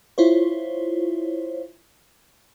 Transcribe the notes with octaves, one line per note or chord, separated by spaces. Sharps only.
E4 F4 C5 C#5